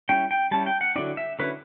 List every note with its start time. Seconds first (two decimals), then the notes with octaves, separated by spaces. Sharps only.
0.09 G3 C#4 E4 G5
0.31 G5
0.51 G3 C#4 E4 A5
0.66 G5
0.81 F#5
0.96 D3 F#3 C#4 E4 D5
1.17 E5
1.39 D3 F#3 C#4 E4 B4